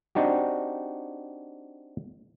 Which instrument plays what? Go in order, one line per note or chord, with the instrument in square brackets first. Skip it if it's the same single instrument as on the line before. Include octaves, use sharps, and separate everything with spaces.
[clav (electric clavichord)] C4 D4 D#4 F#4 G4